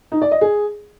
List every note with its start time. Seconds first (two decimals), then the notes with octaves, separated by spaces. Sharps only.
0.12 D#4
0.22 D5
0.31 D#5
0.41 G#4